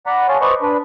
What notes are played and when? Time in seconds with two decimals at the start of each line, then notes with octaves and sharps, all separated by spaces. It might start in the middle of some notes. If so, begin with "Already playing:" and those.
0.06 D5 F#5 A#5 B5
0.29 G#4 C#5 F5 A5 C6
0.41 B4 C5 D5 D#5 C#6
0.62 D4 B4